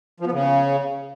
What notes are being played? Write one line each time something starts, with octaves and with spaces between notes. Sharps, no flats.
F3
B3
C#3